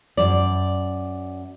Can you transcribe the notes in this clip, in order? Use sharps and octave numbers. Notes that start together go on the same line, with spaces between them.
F#2 D5